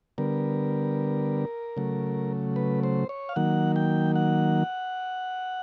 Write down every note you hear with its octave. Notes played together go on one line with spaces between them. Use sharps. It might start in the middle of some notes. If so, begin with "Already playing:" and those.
D3 G3 B3 A#4
C#3 F#3 A3
B4
C5
C#5
F5
D#3 F#3 A#3 F#5
G5
F#5